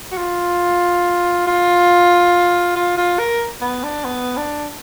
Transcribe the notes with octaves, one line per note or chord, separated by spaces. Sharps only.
F#4
F4
F4
F4
F4
A#4
B3
D4
B3
D4